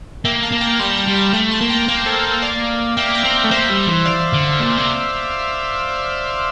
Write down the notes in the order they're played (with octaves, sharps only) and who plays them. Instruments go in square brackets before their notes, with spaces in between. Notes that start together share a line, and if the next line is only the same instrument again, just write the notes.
[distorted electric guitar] A#3 [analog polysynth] E5 G5
[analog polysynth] F5 A5
[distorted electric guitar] A#3
[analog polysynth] G5 A#5
[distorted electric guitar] G3 [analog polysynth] A5 C6
[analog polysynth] G5 A#5
[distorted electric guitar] G3
[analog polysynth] A5 C6
[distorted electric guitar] A3 [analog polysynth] G5 A#5
[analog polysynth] A5 C6
[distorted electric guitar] A#3
[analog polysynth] G5 A#5
[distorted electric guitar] A#3 [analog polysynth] F5 A5
[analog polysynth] A4 C5
A4
D5 F5
[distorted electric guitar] A#3 [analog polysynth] E5 G5
[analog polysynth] G5 A#5
[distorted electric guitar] C4
A3
[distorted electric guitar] A#3 [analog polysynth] C5 E5
[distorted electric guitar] G3
E3
[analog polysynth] D5 F5
[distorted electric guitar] D3
A#2
C3